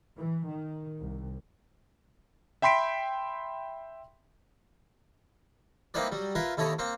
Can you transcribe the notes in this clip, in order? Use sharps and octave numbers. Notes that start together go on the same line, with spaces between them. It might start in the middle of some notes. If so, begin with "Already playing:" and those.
E3
D#3
C2
E5 G5 B5 C6 B6 D7
A#3 C4 D#4 E4 B4 D5
F#3 G3
E4 F4 A#4 B4
D#2 E4 A4 C#5 A#5 D#6
A#3 C4 C5 C#6